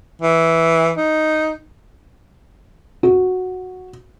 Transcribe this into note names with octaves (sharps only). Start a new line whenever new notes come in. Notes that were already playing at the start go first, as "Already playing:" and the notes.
E3
D#4
F#4